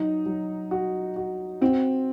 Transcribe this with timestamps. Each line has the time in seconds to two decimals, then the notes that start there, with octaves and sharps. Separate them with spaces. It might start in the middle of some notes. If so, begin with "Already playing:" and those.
Already playing: F#3 D#4
0.26 F#3
0.71 F#4
1.16 F#4
1.61 C4 F#4